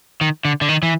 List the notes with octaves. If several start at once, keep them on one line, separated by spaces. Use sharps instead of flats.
D#3
D3
D3
D#3
E3